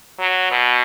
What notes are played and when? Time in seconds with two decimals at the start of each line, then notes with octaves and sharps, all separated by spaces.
0.20 F#3
0.52 B2